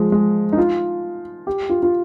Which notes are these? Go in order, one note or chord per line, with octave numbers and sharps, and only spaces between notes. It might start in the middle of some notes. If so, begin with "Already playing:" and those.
Already playing: F3 G#3
G#3
D#4
F4
G4
F4
F4